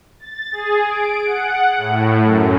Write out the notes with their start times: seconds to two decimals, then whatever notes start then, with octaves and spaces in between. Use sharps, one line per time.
0.20 A6
0.52 G#4
0.86 D7
1.25 F#5
1.77 A2
2.24 F#2